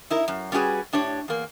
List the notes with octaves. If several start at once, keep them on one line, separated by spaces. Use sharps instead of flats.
D#4 E4 A#4
F#2
G3 C#4 D4 F#4 G#4 B4
A2 D4 G4 C#5
E2 A#3